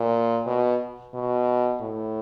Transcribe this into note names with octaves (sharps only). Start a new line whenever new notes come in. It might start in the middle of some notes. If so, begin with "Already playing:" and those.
Already playing: A#2
B2
B2
A2